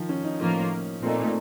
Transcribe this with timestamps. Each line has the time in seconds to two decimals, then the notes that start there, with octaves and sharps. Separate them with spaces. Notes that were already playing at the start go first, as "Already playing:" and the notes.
Already playing: D#3 F3
0.09 C#4
0.24 D#4
0.39 A2 F3 A#3 C#4 F4
1.02 A#2 A3 C4 D#4
1.17 A#3